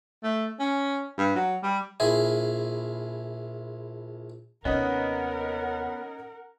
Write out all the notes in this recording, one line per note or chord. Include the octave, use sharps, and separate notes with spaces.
A3
C#4
G2
F#3
G3
A#1 E4 G#4
D#2 C3 B3 C#4 D#4 A#4 D#5 F#5